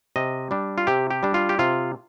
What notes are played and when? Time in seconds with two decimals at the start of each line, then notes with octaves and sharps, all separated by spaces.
0.16 C3 D#5
0.51 G3 D4
0.78 F4
0.87 C3 G4
1.10 G4
1.23 G3 D4
1.34 F4
1.49 G4
1.59 C3 F4